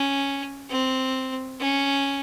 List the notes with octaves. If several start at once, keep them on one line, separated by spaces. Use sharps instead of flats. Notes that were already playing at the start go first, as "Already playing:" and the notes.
Already playing: C#4
C4
C#4